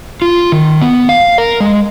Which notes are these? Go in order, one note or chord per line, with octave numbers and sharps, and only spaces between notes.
F4
D#3
B3
F5
A#4
G#3